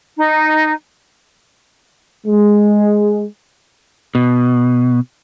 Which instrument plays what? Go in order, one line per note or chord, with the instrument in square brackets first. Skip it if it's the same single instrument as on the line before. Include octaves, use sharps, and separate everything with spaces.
[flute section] D#4
[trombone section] G#3
[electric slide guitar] B2